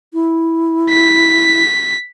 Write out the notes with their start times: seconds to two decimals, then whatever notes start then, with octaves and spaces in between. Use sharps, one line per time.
0.14 E4
0.90 B6